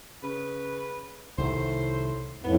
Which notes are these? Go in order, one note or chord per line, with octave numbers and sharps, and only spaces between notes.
C#3 B4
C2 A2 D#3 C5
G#1 F2 A2 B3